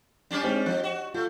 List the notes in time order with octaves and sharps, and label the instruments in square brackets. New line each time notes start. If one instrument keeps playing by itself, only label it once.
[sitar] G3 C#4 D4
[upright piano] G#3 C4 D#4
[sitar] F3 [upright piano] D#5 F#6
[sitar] F#4
[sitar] A3 [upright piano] F4